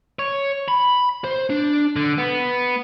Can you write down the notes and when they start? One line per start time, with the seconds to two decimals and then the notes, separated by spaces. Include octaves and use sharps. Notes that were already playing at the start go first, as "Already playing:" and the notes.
0.19 C#5
0.68 B5
1.24 C5
1.50 D4
1.96 D3
2.18 B3